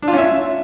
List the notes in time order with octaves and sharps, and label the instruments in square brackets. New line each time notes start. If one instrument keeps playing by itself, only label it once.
[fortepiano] D4
F4
C#4
E5